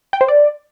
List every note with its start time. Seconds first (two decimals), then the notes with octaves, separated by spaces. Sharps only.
0.13 G5
0.21 C5
0.28 D5